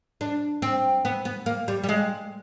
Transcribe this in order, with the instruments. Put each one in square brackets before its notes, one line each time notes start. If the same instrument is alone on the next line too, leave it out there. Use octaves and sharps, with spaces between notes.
[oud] D4
C4
B3
B3
A#3
G3
G3
G#3